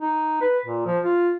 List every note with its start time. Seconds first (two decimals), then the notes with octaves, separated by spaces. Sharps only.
0.01 D#4
0.41 B4
0.66 A#2
0.86 F3
1.03 F4